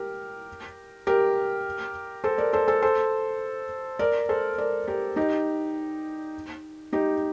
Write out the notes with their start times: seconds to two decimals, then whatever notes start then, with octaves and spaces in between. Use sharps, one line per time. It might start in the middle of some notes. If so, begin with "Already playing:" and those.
Already playing: G4 A#4
1.07 G4 A#4
2.24 A4 C5
2.38 A#4 D5
2.53 A4 C5
2.68 A4 C5
2.82 A4 C5
3.99 A#4 D5
4.29 A4 C5
4.58 A#4 D5
4.87 G4 A#4
5.16 D#4 G4
6.93 D#4 G4